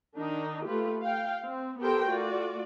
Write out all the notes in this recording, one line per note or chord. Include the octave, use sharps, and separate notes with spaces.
D#3 D4 D#4
A3 F4 G4 B4
F5 G5
C4
B3 G4 A4 A#4 C5 G5
A3 F4 F#4 D5